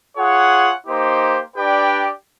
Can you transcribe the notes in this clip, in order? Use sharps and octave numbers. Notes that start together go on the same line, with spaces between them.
F4 G#4 C#5 F#5
A#3 D#4 G4 C5
D4 G4 B4 D5 G5